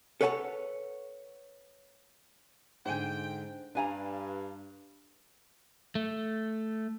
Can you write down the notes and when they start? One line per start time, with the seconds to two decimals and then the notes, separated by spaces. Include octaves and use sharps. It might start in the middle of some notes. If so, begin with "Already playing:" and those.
0.21 A4 B4 C#5 F#5 G#5 A5
2.86 G#2 D3 C5 G5 G#5
3.75 G2 D4 B4 F5 G#5 A#5
5.95 A3